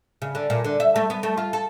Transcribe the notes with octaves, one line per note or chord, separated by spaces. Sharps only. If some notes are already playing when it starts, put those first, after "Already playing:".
C#3
D3
A#2
D3
E5
A3
B3
A3
F4
A4